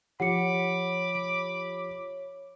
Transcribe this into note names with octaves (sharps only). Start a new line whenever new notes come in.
F3 G4 C#5 F#5 B5 D6 C#7
D7